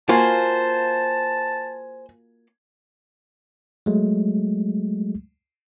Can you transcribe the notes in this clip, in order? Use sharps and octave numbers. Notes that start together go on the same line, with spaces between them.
A#3 F4 F#4 C5 G#5 A5
F#3 G#3 A3